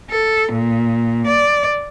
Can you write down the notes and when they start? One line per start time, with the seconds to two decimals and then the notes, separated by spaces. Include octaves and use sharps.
0.10 A4
0.52 A#2
1.27 D5